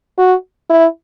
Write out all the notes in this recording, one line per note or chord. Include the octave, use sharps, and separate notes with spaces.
F#4
E4